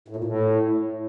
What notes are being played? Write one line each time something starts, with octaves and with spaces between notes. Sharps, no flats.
A2
A#2
A2